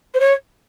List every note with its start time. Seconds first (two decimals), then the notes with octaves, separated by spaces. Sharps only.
0.14 C5
0.20 C#5